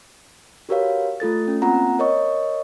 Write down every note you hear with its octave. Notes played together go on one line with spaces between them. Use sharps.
F#4 G4 A#4 B4 C#5 F5
A3 F4 A4 A6
C#4
A#3 C4 F4 F#5 A#5
A#4 C#5 D#5 C#6